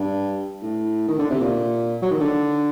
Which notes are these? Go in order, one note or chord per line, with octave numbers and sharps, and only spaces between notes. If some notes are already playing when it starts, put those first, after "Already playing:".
Already playing: G2
A2
D#3
D3
C3
A#2
F#3
D#3
D3